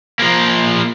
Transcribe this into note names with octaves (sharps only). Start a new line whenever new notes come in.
F3 A#3